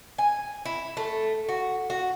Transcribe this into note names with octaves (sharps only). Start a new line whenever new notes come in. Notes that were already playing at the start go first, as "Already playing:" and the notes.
G#5
E4
A3
F#4
F#4